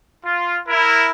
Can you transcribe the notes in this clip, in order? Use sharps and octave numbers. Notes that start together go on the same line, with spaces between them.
F4
E4 A#4